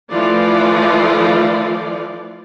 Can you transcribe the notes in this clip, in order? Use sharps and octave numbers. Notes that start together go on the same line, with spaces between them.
E3 F3 A3 F4 D5